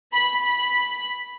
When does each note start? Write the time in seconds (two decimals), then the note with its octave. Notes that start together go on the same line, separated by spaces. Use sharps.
0.13 B5
0.43 B5